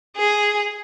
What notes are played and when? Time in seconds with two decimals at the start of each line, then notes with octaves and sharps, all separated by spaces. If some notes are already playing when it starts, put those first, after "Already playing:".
0.17 G#4